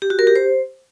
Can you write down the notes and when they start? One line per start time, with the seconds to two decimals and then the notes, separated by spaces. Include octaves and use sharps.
0.02 G4
0.10 F#4
0.19 A#4
0.27 G4
0.36 C5